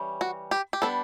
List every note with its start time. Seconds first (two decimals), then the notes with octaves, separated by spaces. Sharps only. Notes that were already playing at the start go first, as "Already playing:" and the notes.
Already playing: E3 G3 C#4
0.21 F#4
0.51 G4
0.73 G4
0.82 G3 B3 D4 A4